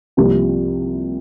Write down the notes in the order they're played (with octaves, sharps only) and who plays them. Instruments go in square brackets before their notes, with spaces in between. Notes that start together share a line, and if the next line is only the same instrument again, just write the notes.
[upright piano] C2 C3 F3 A#3 G4